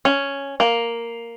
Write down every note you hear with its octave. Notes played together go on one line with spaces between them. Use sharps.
C#4
A#3